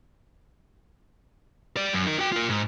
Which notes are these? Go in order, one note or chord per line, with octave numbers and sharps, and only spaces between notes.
G3 D5
F#2
D#4 A#4
F#4 G5
F4 A#4
G#2